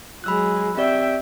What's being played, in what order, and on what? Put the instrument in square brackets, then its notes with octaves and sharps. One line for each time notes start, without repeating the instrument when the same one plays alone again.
[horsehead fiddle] F#3 G#3 [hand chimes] B5 E6 F#6
[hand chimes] C4 G4 D5 [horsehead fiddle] E5 G5